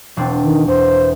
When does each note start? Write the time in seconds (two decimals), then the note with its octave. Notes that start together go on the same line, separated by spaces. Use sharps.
0.17 E1 C4 D4
0.43 D#3
0.68 E2 C5